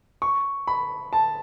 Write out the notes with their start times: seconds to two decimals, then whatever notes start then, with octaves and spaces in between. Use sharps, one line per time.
0.22 C#6
0.67 B5
1.13 A5